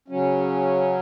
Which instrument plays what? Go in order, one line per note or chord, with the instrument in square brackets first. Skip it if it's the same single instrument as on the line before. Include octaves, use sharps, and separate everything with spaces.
[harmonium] C#3 F#3 C#4